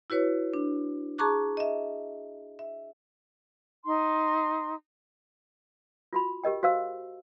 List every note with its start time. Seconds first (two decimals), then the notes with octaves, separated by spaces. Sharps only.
0.10 E4 F#4 B4 C#5
0.54 D4
1.18 G#4 A5 A#5 C#6 D6 F#6
1.57 D#5 E5
2.59 E5
3.84 D#4 C6
6.13 F4 F#4 B5
6.44 G4 A#4 D#5 G5
6.63 F#4 C5 F5 E6